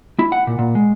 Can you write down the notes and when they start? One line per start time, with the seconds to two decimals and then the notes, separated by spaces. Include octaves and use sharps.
0.19 E4
0.32 F#5
0.47 A#2
0.59 A#2
0.75 G#3